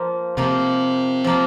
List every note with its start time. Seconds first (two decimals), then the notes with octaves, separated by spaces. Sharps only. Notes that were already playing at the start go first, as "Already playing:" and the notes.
Already playing: F3 A#3 F4
0.37 C3 F3 A#3 F4
1.24 F3 A#3 F4